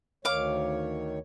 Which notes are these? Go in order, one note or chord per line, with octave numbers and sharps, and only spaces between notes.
D2 D#3 C#5 F5 D6